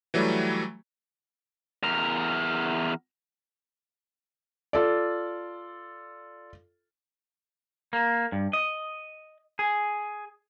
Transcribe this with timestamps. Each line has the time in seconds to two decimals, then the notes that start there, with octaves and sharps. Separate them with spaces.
0.14 E3 F#3 G3 A3
1.83 E2 A#4
4.73 F4 A4 D5
7.93 A#3
8.32 G2
8.53 D#5
9.59 G#4